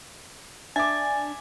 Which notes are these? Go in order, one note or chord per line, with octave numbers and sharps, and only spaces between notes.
D4 E5 G#5 D6 A6